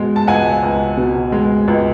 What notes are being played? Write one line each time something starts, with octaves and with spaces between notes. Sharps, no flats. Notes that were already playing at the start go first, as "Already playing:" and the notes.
Already playing: B2 G#3
A5
C#2 F#5 G#5
C#2
B2
G#3
C#2